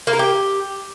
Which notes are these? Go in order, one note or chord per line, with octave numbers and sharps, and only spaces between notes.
A#3
A#4
G4